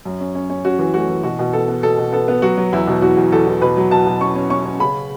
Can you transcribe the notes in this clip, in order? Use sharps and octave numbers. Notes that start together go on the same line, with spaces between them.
F#2
C#4
C#4
C#4
C#4 F#4
E3
A3 F#4
E3
B2 F#4
B2
B3 A4
B3
B2 A4
B2
B3 A4
B3
F#3 F#4
F#3
E2 E4
B2
E2 F#4
E2
E2 A4
E2
B2 B4
F#3
B2 A5
B2
C#4 C#6
C#4
C#4 C#6
C#4
C#3 B5